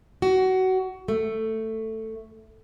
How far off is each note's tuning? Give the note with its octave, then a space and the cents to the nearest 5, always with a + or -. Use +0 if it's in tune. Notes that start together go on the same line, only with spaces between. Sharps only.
F#4 +20
A3 +10